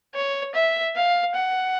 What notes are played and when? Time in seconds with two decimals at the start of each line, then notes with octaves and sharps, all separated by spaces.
0.15 C#5
0.55 E5
0.96 F5
1.35 F#5